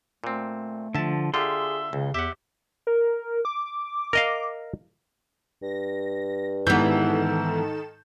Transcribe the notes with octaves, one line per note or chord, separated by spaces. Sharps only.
A#2 A3 C4
D3 F3 E5 A5
D3 F4 G4 G#4 E5 C6
C#2 C#3
E2 G4 E5 F#5
A#4
D6
A#4 D#5 F5
G2 A#6
G#2 D#3 E3 B3 A4 G6 E7